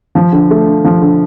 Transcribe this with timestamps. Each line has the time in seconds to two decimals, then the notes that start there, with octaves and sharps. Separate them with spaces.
0.15 F3
0.32 D3
0.50 A3
0.67 D3
0.84 F3
1.01 D3